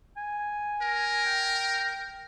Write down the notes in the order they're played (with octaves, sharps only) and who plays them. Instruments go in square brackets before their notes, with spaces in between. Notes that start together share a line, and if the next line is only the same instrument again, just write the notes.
[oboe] G#5
[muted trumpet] A#4
[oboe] G5